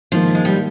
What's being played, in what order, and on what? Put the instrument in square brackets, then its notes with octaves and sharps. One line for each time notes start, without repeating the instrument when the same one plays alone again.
[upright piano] G#2 D#3 A#3 [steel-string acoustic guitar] F3
[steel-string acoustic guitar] G#3
G3